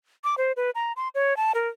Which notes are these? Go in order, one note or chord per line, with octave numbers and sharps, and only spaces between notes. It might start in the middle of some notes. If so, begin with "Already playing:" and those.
D6
C5
B4
A#5
C6
C#5
A5
A#4